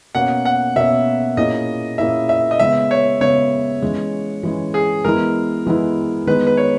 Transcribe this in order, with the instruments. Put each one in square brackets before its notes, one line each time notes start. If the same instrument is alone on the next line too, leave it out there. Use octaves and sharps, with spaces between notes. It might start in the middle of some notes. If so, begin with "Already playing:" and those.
[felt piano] B2 A#3 C#4 [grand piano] F#5
[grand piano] F#5
[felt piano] B2 A#3 C#4 [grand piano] E5
[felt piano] A#2 A#3 C#4 E4 G#4 [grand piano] D#5
[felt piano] A#2 A#3 C#4 E4 G#4 [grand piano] E5
[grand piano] E5
D#5
[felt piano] C#3 G#3 B3 [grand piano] E5
[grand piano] C#5
[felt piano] C#3 G#3 B3 [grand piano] C#5
[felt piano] E3 G#3 C#4
E3 G#3 C#4
[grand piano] G#4
[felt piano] E3 G#3 B3 E4 [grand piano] A#4
[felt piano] E3 G#3 B3 E4
[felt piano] D#3 G#3 B3 [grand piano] B4
[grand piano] B4
C#5